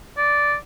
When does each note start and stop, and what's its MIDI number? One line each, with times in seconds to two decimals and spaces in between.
0.17 0.55 74